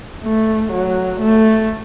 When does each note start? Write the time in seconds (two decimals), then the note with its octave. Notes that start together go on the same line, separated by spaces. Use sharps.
0.24 A3
0.72 F#3
1.20 A3